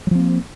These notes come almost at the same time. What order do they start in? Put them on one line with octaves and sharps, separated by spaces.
F#3 F3 C4 A#3